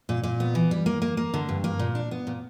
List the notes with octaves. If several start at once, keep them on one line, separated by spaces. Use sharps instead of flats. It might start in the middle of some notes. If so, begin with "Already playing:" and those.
A#2
A#2
B3
E3
G3
A#3
A#3
A#3
D3
G2
A#3
A#2
D4
B3
A#2